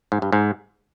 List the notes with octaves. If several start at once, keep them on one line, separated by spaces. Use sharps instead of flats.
G#2
G2
G#2